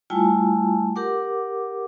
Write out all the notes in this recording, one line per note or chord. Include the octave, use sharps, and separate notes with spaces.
G3 A3 E4 F4 G#5 A5
G4 A#4 F#5 D6